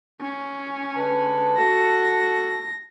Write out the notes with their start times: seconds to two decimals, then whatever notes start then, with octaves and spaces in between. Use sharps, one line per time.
0.22 C#4
0.96 D3 G#3 B4 A5
1.58 F#4 A4 A#6